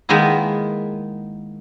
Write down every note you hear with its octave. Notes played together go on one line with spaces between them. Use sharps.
D#3 G#3 A#3 B3 E4